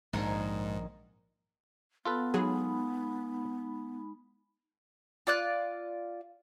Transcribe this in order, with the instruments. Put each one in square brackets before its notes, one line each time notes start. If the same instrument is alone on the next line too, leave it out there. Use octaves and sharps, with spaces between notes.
[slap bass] A#1 [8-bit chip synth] G#2 [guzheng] D#3 D#4 G#4
[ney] B3 [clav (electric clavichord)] F4 A4 B4
[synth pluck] F#3 G#4 [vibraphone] G#3 D#4 B5
[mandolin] F4 D5 F#6